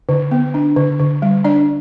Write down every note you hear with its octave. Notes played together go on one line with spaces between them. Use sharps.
D3
B3
D4
D3
D3
G3
D4 D5